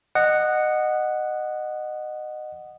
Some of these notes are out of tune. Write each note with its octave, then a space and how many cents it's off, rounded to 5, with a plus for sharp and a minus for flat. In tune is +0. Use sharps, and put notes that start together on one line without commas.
D#5 -20 F#5 +0